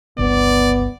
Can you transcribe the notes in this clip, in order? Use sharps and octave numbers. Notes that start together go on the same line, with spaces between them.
G1 C#2 B3 D5